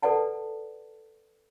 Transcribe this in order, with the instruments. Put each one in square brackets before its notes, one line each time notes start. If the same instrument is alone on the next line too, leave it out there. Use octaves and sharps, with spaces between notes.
[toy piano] A4 B4 D5 F#5 A5